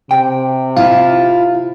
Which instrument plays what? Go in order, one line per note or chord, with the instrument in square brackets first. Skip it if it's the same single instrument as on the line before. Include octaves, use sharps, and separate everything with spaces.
[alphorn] C3 [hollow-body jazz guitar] G5
[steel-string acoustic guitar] E4 F4 [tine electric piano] F5